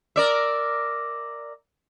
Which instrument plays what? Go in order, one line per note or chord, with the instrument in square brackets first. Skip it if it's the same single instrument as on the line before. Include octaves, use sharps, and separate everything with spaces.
[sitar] A#4 D5 E5